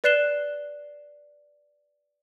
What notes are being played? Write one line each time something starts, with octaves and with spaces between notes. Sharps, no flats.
B4 D5 F#6 C7 E7 G7